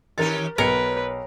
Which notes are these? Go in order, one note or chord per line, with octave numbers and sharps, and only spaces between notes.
D#3 C#4 G4 A#4 A6
B1 A#4 B4 C#5 C#7